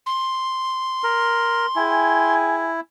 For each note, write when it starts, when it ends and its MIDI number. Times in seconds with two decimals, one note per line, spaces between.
0.06 2.34 84
1.04 1.66 70
1.76 2.80 64
1.76 2.76 68
1.76 2.76 79
1.76 2.76 80